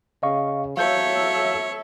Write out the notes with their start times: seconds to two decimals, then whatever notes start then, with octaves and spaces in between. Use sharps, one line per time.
0.23 C#3 D#5 F5 C#6
0.77 F#3 A4 C#5 E5 F5 G6